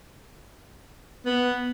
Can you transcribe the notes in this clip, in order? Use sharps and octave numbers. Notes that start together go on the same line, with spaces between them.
B3